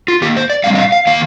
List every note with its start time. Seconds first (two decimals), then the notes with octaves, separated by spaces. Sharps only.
0.08 F4
0.22 D#3 A#3 G4
0.37 C5
0.50 D5
0.64 A2 G3 C4 F5
0.75 D#5
0.78 F5
0.92 F5
1.07 D#3 A#3 F5